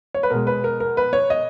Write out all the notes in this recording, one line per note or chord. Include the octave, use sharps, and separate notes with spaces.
C#5
B4
B2 G#3 A#4
B4
A#4
A#4
B4
C#5
D#5